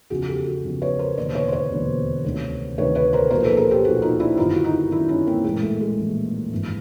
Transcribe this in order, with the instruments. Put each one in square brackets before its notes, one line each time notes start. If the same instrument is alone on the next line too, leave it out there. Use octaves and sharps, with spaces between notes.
[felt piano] E2 C#3 F3 F#4 G#4
G4 A4
F#4 G#4
E2 C#3 F3
B4 C#5
A#4 C5
E1 D#2 D3 C5 D5
B4 C#5
C5
B4 C#5
E1 D#2 D3
D2 C3 D#3
D2 C3 D#3 B4 C#5
B4 C#5
A#4 C5
B1 A#2 F3 A#4 C5
A4 B4
G#4 A#4
G4 A4
B1 A#2 F3 F#4 G#4
D#4 F4
D4 E4
G1 F#2 D#3 D#4 F4
E4 F#4
D#4 F4
G1 F#2 D#3 D4 E4
C#4 D#4
A#3 C4
A#1 A2 E3 G#3 A#3
A3
G#3
A#1 A2 E3
G#1 G2 E3